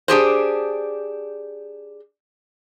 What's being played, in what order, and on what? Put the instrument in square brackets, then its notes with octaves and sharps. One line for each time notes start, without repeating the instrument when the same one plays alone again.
[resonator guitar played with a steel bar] D4 G4 G#4 C5